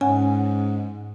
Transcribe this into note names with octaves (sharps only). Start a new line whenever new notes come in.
G#2 C#4 F#5 G#5